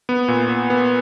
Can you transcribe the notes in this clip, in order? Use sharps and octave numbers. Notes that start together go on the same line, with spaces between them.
B3
A#2
B3
B3